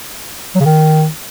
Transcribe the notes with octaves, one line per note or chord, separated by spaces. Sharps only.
F#3
C#3
D#3